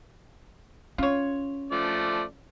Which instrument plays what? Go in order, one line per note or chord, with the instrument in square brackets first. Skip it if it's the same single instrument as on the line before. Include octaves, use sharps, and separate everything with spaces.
[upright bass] C#4 [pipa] F4 C#5
[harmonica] F3 A3 D5